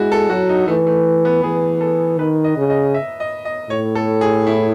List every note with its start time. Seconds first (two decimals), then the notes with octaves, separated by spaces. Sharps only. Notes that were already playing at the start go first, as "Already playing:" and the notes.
Already playing: G#3 E4 F#4
0.12 A4
0.30 F#3 F#4
0.49 D#4
0.68 E3 A3
0.87 A3
1.25 B3
1.43 E3 G#4
1.81 A4
2.19 D#3 B4
2.44 D#5
2.57 C#3
2.70 D#5
2.94 E5
3.20 D#5
3.45 D#5
3.70 A2 C#5
3.95 A4
4.21 G#4
4.47 E4